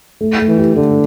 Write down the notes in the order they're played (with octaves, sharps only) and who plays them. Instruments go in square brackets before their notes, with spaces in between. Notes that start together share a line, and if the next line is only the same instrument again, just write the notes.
[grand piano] A3
A3
[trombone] E3
[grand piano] G4
[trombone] D3 [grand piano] A3